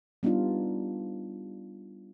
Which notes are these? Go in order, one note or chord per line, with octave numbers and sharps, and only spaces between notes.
G3 B3 D4 D#4 F4